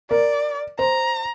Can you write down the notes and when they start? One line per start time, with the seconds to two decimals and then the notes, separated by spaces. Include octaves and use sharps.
0.11 A#4 D5
0.79 C5 A#5